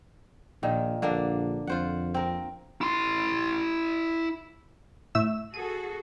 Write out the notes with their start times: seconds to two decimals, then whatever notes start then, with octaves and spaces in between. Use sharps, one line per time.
0.63 A#1 A#2 D#3
1.02 A#1 D3 A#3 D4
1.67 F2 F4 C5 F#5
2.14 C4 A#4
2.81 E4 C6
5.15 A2 E5 E7
5.54 F#4 G#4 A4 D#7